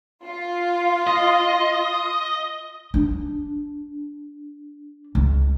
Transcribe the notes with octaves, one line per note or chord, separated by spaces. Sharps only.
F4
D#5
D4
C#2